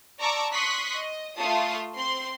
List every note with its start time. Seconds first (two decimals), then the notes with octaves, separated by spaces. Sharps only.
0.20 D5 A5 A#5 C#6 D6 E6
0.52 C6 C#6 D#6 F#6 B6
0.94 D#5
1.37 A3 F4 F5 A5 D#6
1.95 C4 C6